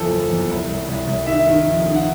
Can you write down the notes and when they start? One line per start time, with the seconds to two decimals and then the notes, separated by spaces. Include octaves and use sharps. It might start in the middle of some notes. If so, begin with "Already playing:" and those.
Already playing: F#1 E2 F3 A4
0.11 E2
0.29 E2
0.49 C2
0.68 C2
0.88 C2
1.07 C2
1.27 D#3 E5
1.47 D#3
1.66 F2
1.85 D#3
1.96 F#5